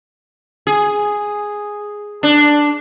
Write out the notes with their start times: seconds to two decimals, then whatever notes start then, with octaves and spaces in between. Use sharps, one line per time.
0.67 G#4
2.23 D4